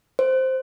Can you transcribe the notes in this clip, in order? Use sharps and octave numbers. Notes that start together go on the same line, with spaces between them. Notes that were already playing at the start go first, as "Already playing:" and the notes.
C5